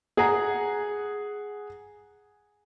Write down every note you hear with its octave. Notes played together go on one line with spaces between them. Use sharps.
G#4 F#5 A#5